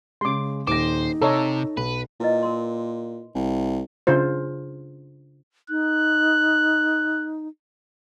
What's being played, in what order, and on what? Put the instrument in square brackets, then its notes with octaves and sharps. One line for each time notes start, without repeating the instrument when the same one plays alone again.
[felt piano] C#3 G#3 [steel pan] C6 D6
[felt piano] D#1 A#6 [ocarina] D#4 [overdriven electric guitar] C5 [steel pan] D6
[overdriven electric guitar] C3 [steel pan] A4 C#5 D#5 [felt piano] A5 A#5 E6
[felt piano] B1 [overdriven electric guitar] B4
[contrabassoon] A#2 [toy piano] E4 B4 D#5
[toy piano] A#4 C6
[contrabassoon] C2
[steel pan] C#3 D4 F4 C5
[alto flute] D#4 [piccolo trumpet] F#6